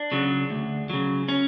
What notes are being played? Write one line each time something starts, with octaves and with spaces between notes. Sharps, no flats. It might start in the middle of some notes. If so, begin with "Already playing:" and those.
Already playing: D4
C#3 F#3
D2
C#3 F#3
C#4